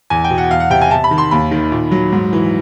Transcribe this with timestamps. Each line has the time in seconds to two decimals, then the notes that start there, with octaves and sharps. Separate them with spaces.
0.10 E2 G#5
0.24 G5
0.30 B2
0.38 F#5
0.51 E2 F5
0.60 F#5
0.70 C3 G5
0.81 G#5
0.91 C3 A5
1.04 B5
1.11 D#3
1.18 C6
1.31 D#2 B5
1.51 D#3
1.72 A#2
1.92 F#3
2.12 G#2
2.33 E3